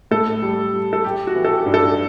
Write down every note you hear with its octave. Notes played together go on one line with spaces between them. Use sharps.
A2 A4
G3
G3
A4
G3 G4
F#4
E3
A4
G4
G2
A4